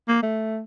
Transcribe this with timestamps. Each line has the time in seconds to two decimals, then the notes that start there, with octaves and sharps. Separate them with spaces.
0.08 A#3
0.22 A3